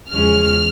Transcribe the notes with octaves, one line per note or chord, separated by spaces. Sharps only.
E2 C#3 F3 G#3 C#4 F6